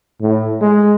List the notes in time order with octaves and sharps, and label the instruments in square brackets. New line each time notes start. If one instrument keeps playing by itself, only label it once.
[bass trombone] A2
G#3